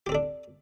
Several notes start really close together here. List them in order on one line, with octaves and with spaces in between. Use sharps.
G4 C4 A4 D4